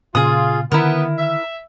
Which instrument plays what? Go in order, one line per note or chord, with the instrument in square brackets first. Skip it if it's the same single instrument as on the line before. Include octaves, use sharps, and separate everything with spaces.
[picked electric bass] A#2 C#3 [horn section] F4 [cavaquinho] G#4 D#6
[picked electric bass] D3 D#3 [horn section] B3 [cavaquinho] E4 A#4
[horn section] E5